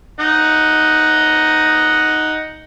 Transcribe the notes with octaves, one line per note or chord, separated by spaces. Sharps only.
D#4 D#5 F#5